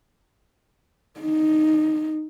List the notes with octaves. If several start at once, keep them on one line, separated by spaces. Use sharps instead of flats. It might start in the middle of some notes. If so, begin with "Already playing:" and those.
D#4